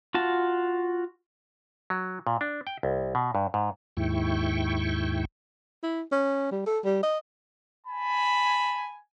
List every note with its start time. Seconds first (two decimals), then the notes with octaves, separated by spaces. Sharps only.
0.14 F4 F#4 A5
1.90 F#3
2.27 A#2
2.41 D4
2.67 G5
2.83 C2
3.15 B2
3.35 G2
3.54 G#2
3.97 D#2 G#2 E4 G5 C#6
5.83 E4
6.12 C#4
6.51 G3
6.67 A4
6.84 G3
7.03 D#5
7.87 G#5 A5 B5